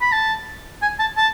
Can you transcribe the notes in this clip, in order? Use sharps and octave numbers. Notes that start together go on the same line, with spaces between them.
B5
A5
G#5
A5
A5